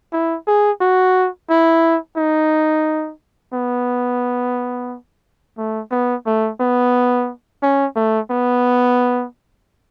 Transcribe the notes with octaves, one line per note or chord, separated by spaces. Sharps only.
E4
G#4
F#4
E4
D#4
B3
A3
B3
A3
B3
C#4
A3
B3